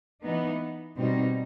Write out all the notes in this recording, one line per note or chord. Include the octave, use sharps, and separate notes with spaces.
E3 B3 D#4
B2 G3 C4 D#4